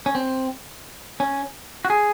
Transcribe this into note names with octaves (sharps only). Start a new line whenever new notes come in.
C#4
C4
C#4
F#4
G#4